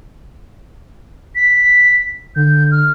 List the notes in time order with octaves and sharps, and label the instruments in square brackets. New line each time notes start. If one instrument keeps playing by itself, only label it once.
[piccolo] B6
[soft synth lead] D3 [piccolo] G6
[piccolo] F6